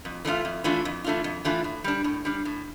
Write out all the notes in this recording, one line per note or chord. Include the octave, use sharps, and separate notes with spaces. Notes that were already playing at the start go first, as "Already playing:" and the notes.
F2
E3 A3 D4 F4
F2
E3 A3 D4 F4
F2
E3 A3 D4 F4
F2
E3 A3 D4 F4
A2
G3 D4
A2
G3 D4
A2